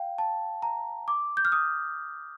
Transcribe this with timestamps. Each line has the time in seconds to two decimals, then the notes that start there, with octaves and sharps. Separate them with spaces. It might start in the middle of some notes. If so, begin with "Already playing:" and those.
Already playing: F5 G5
0.18 A5
0.62 A#5
1.08 D6
1.37 G6
1.45 F6
1.52 D#6